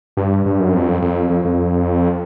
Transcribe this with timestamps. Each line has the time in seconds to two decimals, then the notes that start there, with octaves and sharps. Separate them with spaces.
0.17 G2
0.46 G2
0.60 F#2
0.74 F2
1.02 F2
1.30 F2
1.45 F2